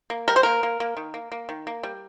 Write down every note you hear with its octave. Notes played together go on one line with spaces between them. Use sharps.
A#3
G3 A#4
C5
A#3 A#4
A#3
A#3
D#3
A#3
A#3
D#3
A#3
G3